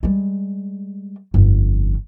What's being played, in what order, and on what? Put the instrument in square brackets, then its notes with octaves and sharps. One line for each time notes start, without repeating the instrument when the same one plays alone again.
[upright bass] G3 G#3
G1 F2